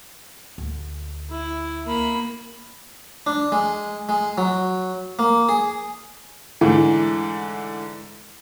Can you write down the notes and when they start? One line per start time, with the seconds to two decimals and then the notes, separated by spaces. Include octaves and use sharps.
0.58 D2
1.31 E4
1.86 A#3 B5
3.27 D4
3.52 G#3
4.09 G#3
4.38 F#3
5.19 A#3
5.49 G#4
6.61 G#2 D3 E3 A3